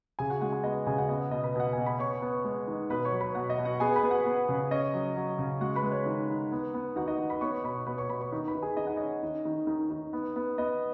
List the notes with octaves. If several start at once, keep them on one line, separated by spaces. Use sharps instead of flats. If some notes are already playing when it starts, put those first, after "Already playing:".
C#3 G#4 G#5
F#4 F#5
G#3 F#4 F#5
G#4 G#5
B3 D#5
C#3 G#4 G#5
F#4 F#5
B3 D#5
D#5
B2 D#5
B4 B5
B2 F#5
B2 G#5
B5
B3 C#5 C#6
B3
G#3
D#3
B2 B4 B5
C#5 C#6
F#3
B4 B5
B2 F#4 F#5
D#5
B2
F#4 F#5
B3 G#4 G#5
B4 B5
B3
F#4 F#5
B3
C#3
C#4 D#5
F#3
F#3
C#3
G#3 F#4 F#5
B4 B5
G#3
C#5
D#3
D#3
B3
B3
D#3 F#4 F#5
D#5
D#3
B4 B5
B3 C#5 C#6
B2 B4 B5
B2 B4 B5
C#5 C#6
B2 B4 B5
C#5 C#6
D#3
B4 B5
D#3
G#4 G#5
D#3 D#5
F#5
C#4 D#5
D#3
D#3
D#3
D#3
B3
B3
B3 D#5